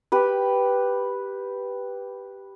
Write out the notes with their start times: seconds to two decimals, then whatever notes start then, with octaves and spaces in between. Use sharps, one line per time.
0.12 G4 B4